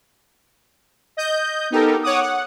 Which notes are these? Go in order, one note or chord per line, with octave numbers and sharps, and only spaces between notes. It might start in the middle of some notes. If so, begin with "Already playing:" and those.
D#5 G6
B3 D#4 G4 A4 A#4
C#5 F#5 D6 D#6
F#5